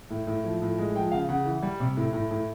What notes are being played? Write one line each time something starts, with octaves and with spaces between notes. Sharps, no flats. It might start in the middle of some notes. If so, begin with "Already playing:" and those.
A2
A2
F3
A2
G#3
F3 G5
C#3 F5
C#3 F#5
E3
G3
C3
A2
A2
A2